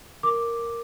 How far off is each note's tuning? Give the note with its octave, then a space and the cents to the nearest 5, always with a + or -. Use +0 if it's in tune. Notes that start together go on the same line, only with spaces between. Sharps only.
A#4 +0 D6 +0